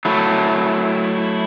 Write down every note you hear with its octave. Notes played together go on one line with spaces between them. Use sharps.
F#3 A3 E4